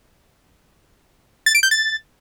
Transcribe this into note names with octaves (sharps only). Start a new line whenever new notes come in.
A6
D7
G6
A6